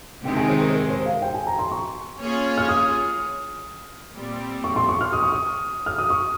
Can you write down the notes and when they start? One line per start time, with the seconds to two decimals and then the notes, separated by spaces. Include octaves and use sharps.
0.24 C3 D#3 G#3 G5
0.37 G#5
0.49 C5
0.61 A#4
0.70 C5
0.74 A#4
0.90 C5
1.06 F5
1.22 G5
1.34 G#5
1.47 A#5
1.59 C6
1.72 C#6
2.19 A#3 C#4 F4 G#4 C#5
2.57 F6
2.69 D#6
4.15 A#2 G3 C4
4.64 C#6
4.76 C6
4.89 C#6
5.01 F6
5.13 D#6
5.23 C#6
5.32 D#6
5.86 F6
5.98 D#6
6.10 C#6